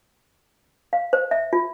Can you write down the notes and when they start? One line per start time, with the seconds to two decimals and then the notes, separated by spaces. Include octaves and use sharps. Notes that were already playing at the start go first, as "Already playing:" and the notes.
0.93 F5
1.13 C5
1.31 E5
1.53 F4